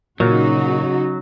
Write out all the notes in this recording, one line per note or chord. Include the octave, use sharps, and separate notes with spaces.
A#2 C#3 F#3 D#4 F#4